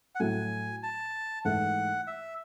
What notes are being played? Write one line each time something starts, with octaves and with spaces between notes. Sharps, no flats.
F#5
A2 F#3 A3 G#5
A5
G#2 E3 A3 E4 F#5
E5